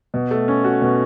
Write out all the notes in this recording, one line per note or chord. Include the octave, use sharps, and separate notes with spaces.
B2
A3
C#4
F#4
B2